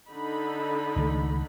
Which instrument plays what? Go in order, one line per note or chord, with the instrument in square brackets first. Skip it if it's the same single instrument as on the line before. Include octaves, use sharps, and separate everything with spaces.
[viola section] D3 D#4 B5
[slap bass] C#2 D#3 A3